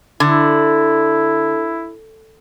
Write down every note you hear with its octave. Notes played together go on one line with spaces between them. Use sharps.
D3 E4